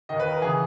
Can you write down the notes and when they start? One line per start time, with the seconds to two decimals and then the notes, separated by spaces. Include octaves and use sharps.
0.09 D#2 D#3 D#5
0.20 B4
0.31 A#4
0.42 C#3 E3 G#4